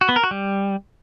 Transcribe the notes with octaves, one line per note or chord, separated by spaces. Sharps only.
F#4
B3
A#4
F#4
G3